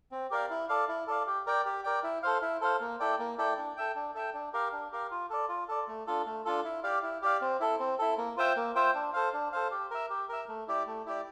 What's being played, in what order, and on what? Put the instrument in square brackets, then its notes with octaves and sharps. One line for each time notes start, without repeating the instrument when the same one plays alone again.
[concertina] C4
G4 A#4 D5 F5
E4
A4 D5 F5
E4
A4 D5 F5
G4
A#4 D5 G5
G4
A#4 D5 G5
E4
A4 C5 F5
E4
A4 C5 F5
A#3
E4 A4 D5 G5
A#3
E4 A4 D5 G5
D4
A4 E5 G5
D4
A4 E5 G5
D4
G4 A#4 F5
D4
G4 A#4 F5
F4
A4 D5
F4
A4 D5
A3
D4 F4 A4
A3
D4 F4 A4
E4
G4 D5 F5
E4
G4 D5 F5
C4
E4 A4
C4
E4 A4
A#3
F4 C5 E5 G5
A#3
F4 C5 E5 G5
D4
A4 C5 F5
D4
A4 C5 F5
G4
A#4 E5
G4
A#4 E5
A3
E4 G4 D5
A3
E4 G4 D5